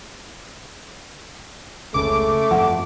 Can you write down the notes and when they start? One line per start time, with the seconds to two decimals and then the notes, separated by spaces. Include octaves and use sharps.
1.94 F1 C#2 C#3 A3 D6
2.51 G1 F2 F3 F#5